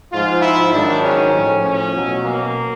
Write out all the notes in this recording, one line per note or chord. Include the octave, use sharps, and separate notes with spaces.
G#2 F3 F4
E4
G#2 D#3 F#3 D4
C#4
A2 F3
C#4
B2 F#3
A#3